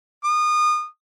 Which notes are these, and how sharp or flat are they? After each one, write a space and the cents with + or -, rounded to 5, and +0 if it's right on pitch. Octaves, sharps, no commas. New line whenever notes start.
D#6 -30